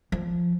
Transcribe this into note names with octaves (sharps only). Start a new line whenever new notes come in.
F3